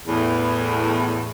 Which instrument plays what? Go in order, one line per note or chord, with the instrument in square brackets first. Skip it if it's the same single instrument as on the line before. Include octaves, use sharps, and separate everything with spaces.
[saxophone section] E2 A2